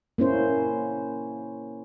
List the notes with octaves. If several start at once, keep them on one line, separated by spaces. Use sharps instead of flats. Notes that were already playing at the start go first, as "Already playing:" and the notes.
A#3 C#4 E4 C5